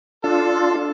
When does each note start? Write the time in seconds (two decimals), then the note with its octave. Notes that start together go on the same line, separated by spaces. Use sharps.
0.24 D4 F4 A4